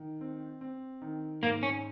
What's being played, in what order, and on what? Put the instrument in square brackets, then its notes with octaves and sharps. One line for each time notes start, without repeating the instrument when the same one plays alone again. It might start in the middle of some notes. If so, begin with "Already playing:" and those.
Already playing: [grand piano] D#3
C4
C4
D#3
[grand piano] G#2 [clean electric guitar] A#3
[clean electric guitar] C#4